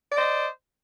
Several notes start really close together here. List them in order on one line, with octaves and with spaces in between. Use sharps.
D5 D#5 C5